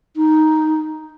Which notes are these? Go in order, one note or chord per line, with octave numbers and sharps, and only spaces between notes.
D#4